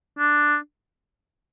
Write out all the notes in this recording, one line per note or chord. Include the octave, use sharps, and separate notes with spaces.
D4